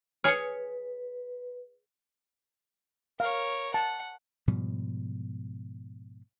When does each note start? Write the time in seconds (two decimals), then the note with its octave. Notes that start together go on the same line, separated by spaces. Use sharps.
0.24 G#4 B4 C#5 F6 C#7
3.20 A#4 C#5 F5
3.74 F#5 A5
4.47 G#2 B2 F3 G3